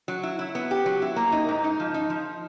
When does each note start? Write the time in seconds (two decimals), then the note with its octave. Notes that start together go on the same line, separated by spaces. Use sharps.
0.08 F#3
0.23 E4
0.39 E4
0.55 B3
0.71 G4
0.86 F#3
1.02 E4
1.16 A#3
1.32 D#4
1.49 G#2
1.64 D#4
1.80 F3
1.94 D#4
2.10 F3